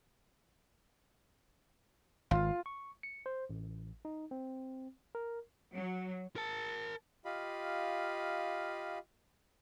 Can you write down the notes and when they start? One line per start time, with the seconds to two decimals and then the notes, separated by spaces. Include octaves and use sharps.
2.31 G#1 F4
2.66 C#6
3.03 C#7
3.26 C5
3.50 A1
4.05 D#4
4.31 C4
5.15 A#4
5.74 F#3
6.36 A#4 A5
7.25 F4 G4 D#5 F5 B5